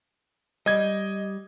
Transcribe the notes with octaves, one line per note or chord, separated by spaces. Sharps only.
G3 D#5 G#6